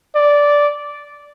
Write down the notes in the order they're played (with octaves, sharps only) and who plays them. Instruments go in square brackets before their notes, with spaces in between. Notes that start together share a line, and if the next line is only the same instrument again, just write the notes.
[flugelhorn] D5